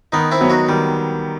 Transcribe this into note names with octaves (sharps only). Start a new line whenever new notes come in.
D#3 B3 D#4
C4 E4
F#3 B3
D#4 F#4
D#3 G3